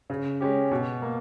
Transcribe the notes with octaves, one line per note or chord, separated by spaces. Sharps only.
C#3
G#3 C#4 G4
B2
A#3